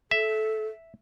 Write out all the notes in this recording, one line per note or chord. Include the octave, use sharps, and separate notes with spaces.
A4 E5